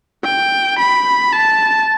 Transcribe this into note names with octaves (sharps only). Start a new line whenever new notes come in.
G5
B5
A5